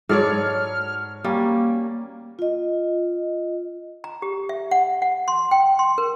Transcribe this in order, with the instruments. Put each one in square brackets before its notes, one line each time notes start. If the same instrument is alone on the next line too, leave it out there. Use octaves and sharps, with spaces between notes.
[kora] G#2 A4 D5 [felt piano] F#3 C#5 [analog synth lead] F6
[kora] G3 C#4 [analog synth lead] A#3
[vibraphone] F4 D#5
[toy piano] A#5
G4
E5
F#5
F#5
C6
G5
C6
A#4